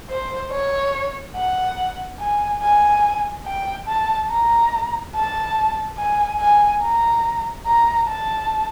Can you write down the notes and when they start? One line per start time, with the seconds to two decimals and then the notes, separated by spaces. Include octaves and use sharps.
0.10 C5
0.51 C#5
1.36 F#5
2.19 G#5
2.62 G#5
3.46 G5
3.87 A5
4.30 A#5
5.15 A5
5.98 G#5
6.40 G#5
6.82 A#5
7.66 A#5
8.08 A5